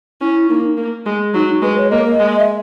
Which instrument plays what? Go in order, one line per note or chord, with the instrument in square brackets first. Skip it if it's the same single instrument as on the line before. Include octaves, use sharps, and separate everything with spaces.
[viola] C#4 [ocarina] E4
[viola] A#3 [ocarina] D#4
[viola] A#3
G#3
[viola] F#3 [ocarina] D#4
[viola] G#3 [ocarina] B4
[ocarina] C#5
[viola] A#3 [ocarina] D#5
[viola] G#3
[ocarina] E5